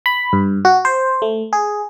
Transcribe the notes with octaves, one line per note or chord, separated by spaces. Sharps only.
B5
G2
F#4
C5
A3
G#4